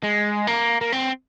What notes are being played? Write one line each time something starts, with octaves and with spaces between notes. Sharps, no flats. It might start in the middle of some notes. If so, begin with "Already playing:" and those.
G#3
A#3
A#3
C4